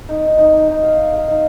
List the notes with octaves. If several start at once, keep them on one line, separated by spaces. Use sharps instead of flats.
D#4
D#4
D#4
D#4
D#4
F5
D#4
F5
D#4